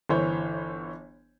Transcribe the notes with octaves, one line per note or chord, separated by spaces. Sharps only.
G1 E3 C5 C#5